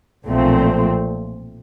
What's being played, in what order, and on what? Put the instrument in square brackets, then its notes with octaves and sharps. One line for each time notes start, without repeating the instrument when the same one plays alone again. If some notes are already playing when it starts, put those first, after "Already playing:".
[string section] B1 A#2 F3 A3 C4